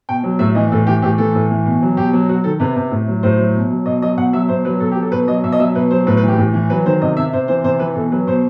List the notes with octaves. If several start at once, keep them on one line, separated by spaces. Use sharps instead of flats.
B2 G5
F#3
A2 E5
E3 D#5
A2 A4
E3 G4
A2 G4
E3 A4
A2
E3
B2
F#3
B2 G4
F#3
F#3 F#4
D#3 A4
C3 B4
C3
A2
F#3
A2 C5
F#3
B2
F#3
B2 D#5
F#3 D#5
B2 F#5
F#3 E5
B2 C5
F#3 B4
B2 A4
G4
F#3
A4
B2 B4
F#3 D#5
B2 E5
D#5
F#3 E5
B2 B4
F#3 C5
A2 B4
B4
E3 G4
A2
E3
F#3 B4
D#3 C5
C3 D#5
C3 E5
C3 C5
E3 C5
C3 C5
E3 B4
B2 A4
F#3 B4
B2 C5